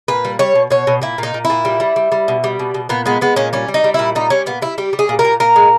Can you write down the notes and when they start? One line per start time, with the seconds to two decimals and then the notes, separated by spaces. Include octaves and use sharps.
0.08 A#2 B4
0.25 G3
0.39 G3 C#5
0.55 B2
0.70 B2 C#5
0.87 B2
1.02 A#2 E4
1.18 A#2 D#4
1.34 A#2
1.45 E4
1.50 A#2
1.65 G3
1.80 G3
1.96 G3
2.12 G3
2.28 B2
2.44 G3
2.59 B2
2.74 B2
2.89 A#2 B3
3.06 G#3 B3
3.21 G#3 B3
3.36 A#2 C#4
3.53 G3 C#4
3.68 G3
3.74 D#4
3.84 G3
3.94 A#2 E4
4.15 G3 D#4
4.30 G3 C#4
4.46 A#2 B3
4.62 G3 E4
4.78 G3 G4
4.93 G3
4.99 G#4
5.09 A#2
5.19 A#4
5.25 A#2
5.40 A#2 A#4
5.56 G#3